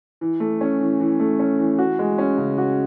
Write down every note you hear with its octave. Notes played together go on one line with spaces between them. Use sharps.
E3
A3
C#4
E3
E3
A3
C#4
E3
F#4
G#3
C#4
C#3
F#4